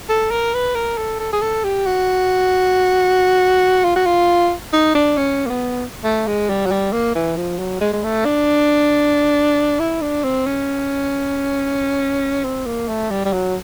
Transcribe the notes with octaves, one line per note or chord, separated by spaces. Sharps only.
A4
A#4
B4
A#4
A4
A4
G#4
A4
G4
F#4
F4
F#4
F4
D#4
D4
C#4
A#3
B3
A3
G#3
G3
F#3
G3
A#3
E3
F3
F#3
G#3
G#3
A3
D4
E4
D4
C4
C#4
C4
A#3
A3
G3
G3
F#3